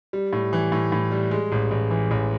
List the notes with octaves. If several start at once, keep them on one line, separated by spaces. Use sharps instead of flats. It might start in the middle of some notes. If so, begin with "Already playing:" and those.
G3
A2
E3
A2
A2
G3
G#3
A1
A1
E3
A1